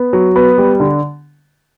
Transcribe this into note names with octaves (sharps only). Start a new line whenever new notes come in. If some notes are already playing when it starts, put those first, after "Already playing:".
Already playing: B3
F#3
B3
G3
D3